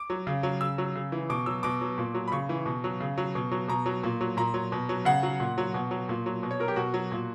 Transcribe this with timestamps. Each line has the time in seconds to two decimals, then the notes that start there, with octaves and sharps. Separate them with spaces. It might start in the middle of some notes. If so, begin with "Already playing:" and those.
Already playing: D6
0.10 F#3
0.27 C#3
0.43 F#3
0.61 C#3 E6
0.78 F#3
0.95 C#3
1.12 E3
1.30 B2 D6
1.46 F#3 E6
1.63 B2 D6
1.81 F#3
1.98 A#2
2.15 F#3
2.27 B5
2.32 C#3 C#6
2.49 E3
2.66 B2
2.84 F#3
3.00 C#3
3.18 F#3
3.35 B2
3.51 F#3
3.68 B2 A#5
3.86 F#3
4.03 A#2
4.21 F#3
4.37 A#2 A#5
4.54 F#3
4.72 B2
4.89 F#3
5.05 C#3 F#5
5.23 F#3
5.40 A#2
5.58 F#3
5.74 B2
5.91 F#3
6.09 A#2
6.26 F#3
6.43 B2
6.51 C#5
6.60 F#3 A#4
6.68 G4
6.76 B2 F#4
6.94 F#3
7.12 A#2